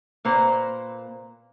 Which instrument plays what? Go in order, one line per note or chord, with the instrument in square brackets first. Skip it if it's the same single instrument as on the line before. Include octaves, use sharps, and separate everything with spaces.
[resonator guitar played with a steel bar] A#2 A#3 B4 C5